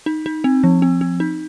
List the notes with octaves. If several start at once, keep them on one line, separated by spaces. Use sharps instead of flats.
D#4
D#4
C4
F3
C4
C4
D#4